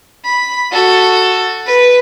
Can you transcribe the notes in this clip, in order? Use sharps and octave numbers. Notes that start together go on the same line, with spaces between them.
B5
F#4 A4
B4